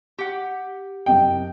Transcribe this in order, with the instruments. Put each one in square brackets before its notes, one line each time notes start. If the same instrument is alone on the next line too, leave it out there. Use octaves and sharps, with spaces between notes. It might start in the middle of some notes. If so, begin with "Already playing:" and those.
[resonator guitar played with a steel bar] G4 F#5
[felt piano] F#1 C3 D#5 [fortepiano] G5